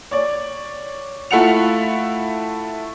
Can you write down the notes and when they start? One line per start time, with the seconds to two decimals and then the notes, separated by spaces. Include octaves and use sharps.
0.11 C#5 D5
1.31 A3 E4 F4 F#5 C#7 F7